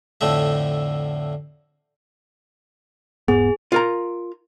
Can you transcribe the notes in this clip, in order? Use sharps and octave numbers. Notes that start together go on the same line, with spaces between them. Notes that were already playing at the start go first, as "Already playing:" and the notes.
F2 A2 D3 A3 E5
E1 G#2 B3 G#4
F4 A#4 A#5